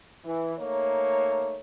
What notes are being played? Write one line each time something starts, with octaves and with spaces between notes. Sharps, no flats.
E3
A3 A#3 D#4 C#5